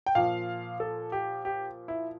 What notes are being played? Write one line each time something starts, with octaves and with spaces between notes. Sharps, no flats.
G5
A#2 F3 F5
A4
G4
G4
E4